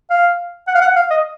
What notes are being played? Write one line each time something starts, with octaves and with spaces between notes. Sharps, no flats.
F5
F#5
F5
F#5
F5
D#5